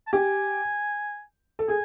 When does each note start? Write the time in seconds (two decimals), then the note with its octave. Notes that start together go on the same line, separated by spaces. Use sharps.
0.07 A5
0.13 G4 G#5
1.59 A4
1.68 G#4 G#5